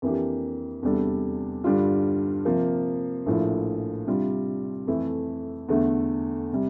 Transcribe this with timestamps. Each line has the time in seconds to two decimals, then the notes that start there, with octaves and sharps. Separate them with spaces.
0.02 F2 E3 A#3 D4 G4
0.83 E2 C3 G3 D4 A4
1.64 G2 D3 G3 D4 F4
2.45 C3 F3 A#3
3.26 A#1 A2 F3 A#3 E4
4.07 C3 G3 D4 F4
4.87 F2 E3 A3 E4
5.69 E2 D3 A3
6.53 C3 G3